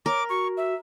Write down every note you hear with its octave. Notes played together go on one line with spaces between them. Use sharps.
A#4 C#5 D6
F#4 C#6
E5